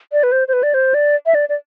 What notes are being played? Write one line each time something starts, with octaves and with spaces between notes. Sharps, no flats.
D5
B4
C5
C5
B4
D5
C5
D5
E5
D5
D5